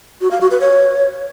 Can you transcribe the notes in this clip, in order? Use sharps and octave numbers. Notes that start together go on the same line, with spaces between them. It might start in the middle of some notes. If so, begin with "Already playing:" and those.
F#4
F5
F#4
B4
C#5